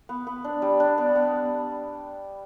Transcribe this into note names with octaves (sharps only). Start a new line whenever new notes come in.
B3
B3
D4
G3
D4
B3
B3